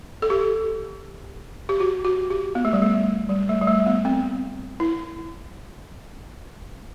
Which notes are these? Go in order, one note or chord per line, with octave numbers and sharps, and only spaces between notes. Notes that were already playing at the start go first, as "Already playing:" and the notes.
A4
G4
G4
F#4
F#4
G4
B3
A3
G3
A3
G3
A3
G3
A3
B3
C4
E4